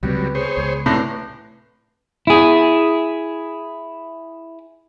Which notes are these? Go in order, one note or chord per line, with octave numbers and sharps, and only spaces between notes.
C#2 C3 F#3 G3 B3 G5
G#4 C5 C#5
C#2
A2 C3 E3 D5 F#5 A#5 C6
E4 G#4